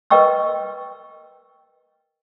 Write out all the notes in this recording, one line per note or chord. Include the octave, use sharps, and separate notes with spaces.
A#4 B4 D#5 G5 C#6 E6